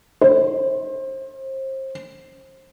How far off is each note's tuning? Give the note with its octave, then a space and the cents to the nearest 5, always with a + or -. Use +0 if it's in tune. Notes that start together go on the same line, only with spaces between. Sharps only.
C5 +30